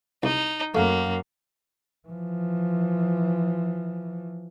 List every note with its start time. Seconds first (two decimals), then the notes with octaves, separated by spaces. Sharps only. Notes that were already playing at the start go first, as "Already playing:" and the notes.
0.23 C2 D#4
0.75 F#2 A3 A#3 F#4 F5
2.09 E3 F3